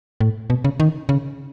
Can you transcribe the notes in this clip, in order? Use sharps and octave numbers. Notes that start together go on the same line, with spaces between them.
A2
B2
C#3
D#3
C#3